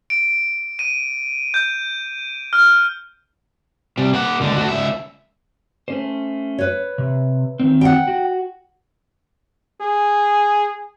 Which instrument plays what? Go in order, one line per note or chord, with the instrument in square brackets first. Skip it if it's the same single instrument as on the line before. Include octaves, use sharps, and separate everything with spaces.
[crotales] D7
D#7
G6
F6
[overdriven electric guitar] C3 G3
A#3 F#5
C#2 D3
A3 F#4
C#2 E5
[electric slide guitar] A3 C#4 C5
[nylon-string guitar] B4 C#5
[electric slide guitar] C3
D#3 C4
[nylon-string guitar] F#5 G5
[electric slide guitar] F#4
[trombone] G#4